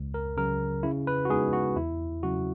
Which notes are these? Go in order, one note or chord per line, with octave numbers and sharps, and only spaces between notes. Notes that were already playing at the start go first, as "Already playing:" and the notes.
Already playing: C#2
A#4
C#3 F#3 A#4
C#3 E4
B4
F#4
G#3 B3 D#4 G#4
F#4
E2 E4
C#3 F#3 C#4 F#4